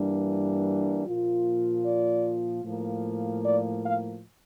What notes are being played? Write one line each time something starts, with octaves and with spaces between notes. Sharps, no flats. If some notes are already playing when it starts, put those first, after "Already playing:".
Already playing: G2 E3 G3 A#3 D4
A#2 F3 A#3 F4
D5
A2 F3 A#3
D5
F5